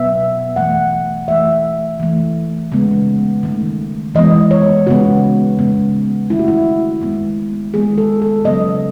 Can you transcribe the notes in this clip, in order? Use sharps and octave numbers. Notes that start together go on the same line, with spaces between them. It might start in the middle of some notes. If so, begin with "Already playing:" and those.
Already playing: B2 F#3 B3 E5
E3 A3 F#5
E3 A3 E5
E3 A3
C#3 G#3 B3
D#3 A3
E3 G#3 B3 D#5
C#5
C#3 G#3 B3 F#4
C#3 G#3 B3
D#3 A3 E4
F#4
E4
D#3 G#3 B3
D#3 G#3 B3 G#4
A4
A4
C#3 F#3 B3 D#5